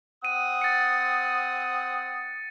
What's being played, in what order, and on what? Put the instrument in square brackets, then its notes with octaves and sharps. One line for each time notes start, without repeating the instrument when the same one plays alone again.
[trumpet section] C4 F#5 D#6 [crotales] D#7
[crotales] A6 C#7